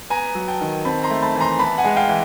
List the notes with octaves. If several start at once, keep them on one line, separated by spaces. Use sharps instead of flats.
B3 G#5 A#5
F#3
G5 A5
D#3
C4 A5 B5
A#5 C6
A3
A5 B5
E3
A#5 C6
B3 A5 B5
F#5 G#5
G#3
F5 G5
E3